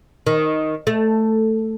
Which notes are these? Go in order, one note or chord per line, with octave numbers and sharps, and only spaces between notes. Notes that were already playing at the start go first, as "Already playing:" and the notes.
D#3
A3